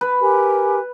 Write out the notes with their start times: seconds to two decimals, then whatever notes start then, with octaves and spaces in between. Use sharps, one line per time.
0.01 B4
0.20 G4 A#4 G#5